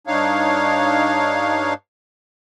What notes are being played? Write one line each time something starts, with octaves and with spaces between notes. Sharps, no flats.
G2 D4 D#4 C#5 F5